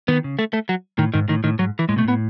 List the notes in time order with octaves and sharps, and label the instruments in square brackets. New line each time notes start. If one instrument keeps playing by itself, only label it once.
[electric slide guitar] D#3 [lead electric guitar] B3
[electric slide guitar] C#3
[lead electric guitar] A3
A3
F#3
[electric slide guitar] A2 [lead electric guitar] D#3
[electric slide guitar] G#2 [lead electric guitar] D#3
[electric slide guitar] A2 [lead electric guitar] D#3
[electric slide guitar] A2 [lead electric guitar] D#3
[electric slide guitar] G#2 [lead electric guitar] F#3
[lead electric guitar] E3
[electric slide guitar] A2 [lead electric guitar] G#3
[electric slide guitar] B2 [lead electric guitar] A3
[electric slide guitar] A2 [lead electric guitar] B3